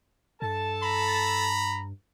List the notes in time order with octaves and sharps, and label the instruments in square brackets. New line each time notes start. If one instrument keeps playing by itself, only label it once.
[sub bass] G2 [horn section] A4 A5
[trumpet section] A#5 B5